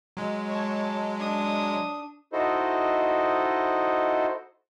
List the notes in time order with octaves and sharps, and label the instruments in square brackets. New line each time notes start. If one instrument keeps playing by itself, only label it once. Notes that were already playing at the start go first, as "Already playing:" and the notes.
[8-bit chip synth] F#3 G#3
[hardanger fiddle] C#5 A5
D4 D#6
[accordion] D#4 E4 F#4 A4 C5 D#5